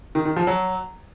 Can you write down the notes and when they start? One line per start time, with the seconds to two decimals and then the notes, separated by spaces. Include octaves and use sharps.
0.15 D#3
0.25 D#3
0.36 F3
0.47 F#3